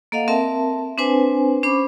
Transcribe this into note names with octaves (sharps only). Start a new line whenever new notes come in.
A#3 A4 D#5 F5 F#5
C4 A#4 E5 A5
C4 D4 B4 C5 G#5
C#4 C5 B5 C#6 D6